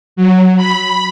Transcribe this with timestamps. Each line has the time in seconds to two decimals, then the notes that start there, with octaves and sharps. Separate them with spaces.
0.16 F#3
0.57 B5